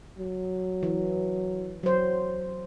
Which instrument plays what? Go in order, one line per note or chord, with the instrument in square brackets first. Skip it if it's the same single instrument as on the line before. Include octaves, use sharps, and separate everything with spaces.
[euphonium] F#3
[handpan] E3
F#3 C5